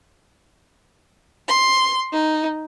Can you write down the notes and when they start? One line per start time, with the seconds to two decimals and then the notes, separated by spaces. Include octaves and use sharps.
1.49 C6
2.13 D#4